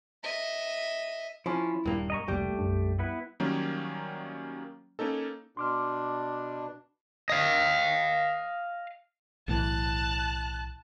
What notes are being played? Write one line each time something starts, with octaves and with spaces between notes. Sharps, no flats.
D#5 E5
F3 C#4 E4
D#1 G2 A#3
D#5 A#5 C#6
F1 C#2 G3 A3 A#3 G4
B1 F#2 D4
B3 E4 B4
D#3 F#3 G3 A#3 C#4
A#3 C#4 D#4 A4
B2 D4 C6 D6 F6
D#5 F5
B1 A2 E3 A5 F#6